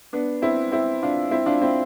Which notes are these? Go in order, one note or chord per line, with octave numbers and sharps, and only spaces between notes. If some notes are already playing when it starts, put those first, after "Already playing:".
B3 D4
C4 E4
C4 E4
D4 F4
C4 E4
D4 F4
C4 E4